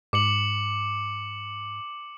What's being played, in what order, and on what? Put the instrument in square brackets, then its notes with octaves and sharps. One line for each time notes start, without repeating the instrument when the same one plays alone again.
[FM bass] G#2 [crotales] D6 C#7 F#7